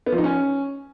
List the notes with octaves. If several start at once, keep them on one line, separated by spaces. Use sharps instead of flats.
B3
F3
D#4
C#4